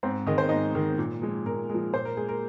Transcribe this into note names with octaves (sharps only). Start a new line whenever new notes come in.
G#2 C4 C5
D#3 G#3 D#5
C5
G#2 D#4 D#5
D#3 G#3
A#2
F3 G#3
A#2 A#4
F3 G#3
A#2 C5
A#4
G#3 G#4
A#4